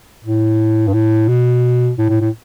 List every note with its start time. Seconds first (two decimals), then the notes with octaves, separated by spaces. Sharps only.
0.25 A2
0.88 G2
0.94 A2
1.29 B2
1.98 A2
2.10 A2
2.21 A2